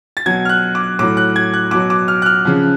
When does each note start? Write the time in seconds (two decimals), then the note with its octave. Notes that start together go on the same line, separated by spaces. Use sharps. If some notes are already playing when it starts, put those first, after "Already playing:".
0.17 A6
0.26 B2 F#3 G#6
0.45 F6
0.49 F#6
0.75 D6
0.99 A2 F#3 D6
1.17 F#6
1.36 G#6
1.54 F#6
1.71 B2 F#3 D6
1.90 D6
2.08 F6
2.22 F#6
2.26 F6
2.45 C#3 F3